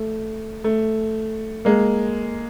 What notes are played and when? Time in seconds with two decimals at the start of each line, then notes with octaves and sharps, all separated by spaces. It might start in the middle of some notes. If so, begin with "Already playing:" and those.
Already playing: A3
0.64 A3
1.65 G#3 A#3